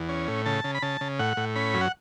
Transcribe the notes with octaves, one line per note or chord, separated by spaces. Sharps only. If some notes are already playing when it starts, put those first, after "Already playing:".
Already playing: E2
C#4
A2
C#3 A5
C#3
B5
C#3 A5
C#3
A2 F#5
A2
C#4 B5
F#2
F#5